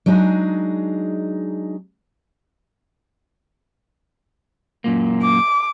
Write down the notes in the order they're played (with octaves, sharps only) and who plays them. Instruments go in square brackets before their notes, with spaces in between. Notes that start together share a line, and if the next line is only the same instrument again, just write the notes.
[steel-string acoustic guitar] F#3 G#3 D4 D#4 G#4
[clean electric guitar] F#2 A#2 A#3
[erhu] D6